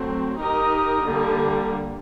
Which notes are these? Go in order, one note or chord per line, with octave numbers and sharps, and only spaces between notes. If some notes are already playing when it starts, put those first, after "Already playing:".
Already playing: F#3 A3 C4
D#4 G4 A#4 D#5
D3 G3 A#3